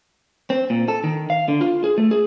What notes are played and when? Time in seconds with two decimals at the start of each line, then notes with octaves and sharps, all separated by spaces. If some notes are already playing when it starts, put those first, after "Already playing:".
0.50 C4
0.70 A#2
0.88 A4
1.04 D#3
1.30 F5
1.48 D3
1.61 F4
1.84 G#4
1.98 A3
2.11 G#4